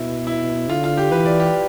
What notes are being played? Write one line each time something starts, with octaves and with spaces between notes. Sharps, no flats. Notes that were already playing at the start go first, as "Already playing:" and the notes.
Already playing: B2 E4
E4
D3 F4
F4
G4
E3 B4
D5
G4